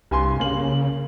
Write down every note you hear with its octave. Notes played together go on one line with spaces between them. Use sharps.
C2 G2 G#5 C6
C#3 A#3 F#7